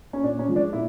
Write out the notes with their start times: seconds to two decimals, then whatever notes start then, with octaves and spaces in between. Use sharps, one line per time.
0.13 C#4
0.23 A#2 D4
0.39 C#4
0.48 F3 G#3
0.56 D4
0.73 A#2 E4